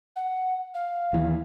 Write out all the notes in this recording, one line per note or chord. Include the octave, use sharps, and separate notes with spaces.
F#5
F5
D#2 E3